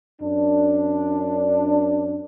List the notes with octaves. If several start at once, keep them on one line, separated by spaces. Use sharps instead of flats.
F#2 D4